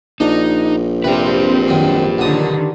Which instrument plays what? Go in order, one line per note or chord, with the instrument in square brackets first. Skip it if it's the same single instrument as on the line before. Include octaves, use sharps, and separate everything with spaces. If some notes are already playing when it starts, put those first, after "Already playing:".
[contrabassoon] A#1 [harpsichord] D4 [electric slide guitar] D#4
[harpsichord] C3 [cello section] C4 [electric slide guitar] G4 B4
[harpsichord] F#2 D#3
[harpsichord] B1 A#2 D#6 [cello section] D3 D#3